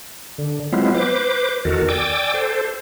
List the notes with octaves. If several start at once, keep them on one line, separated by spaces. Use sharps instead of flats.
D3
F#3 G#3 B3 C4 E4 F4
B4 C5 D6
E2 D#3 F#4 A4 A#4
D5 G5 G#5 D6 E6
A4 C5